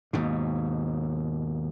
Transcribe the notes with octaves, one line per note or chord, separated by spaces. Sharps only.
D#2 G#2 B2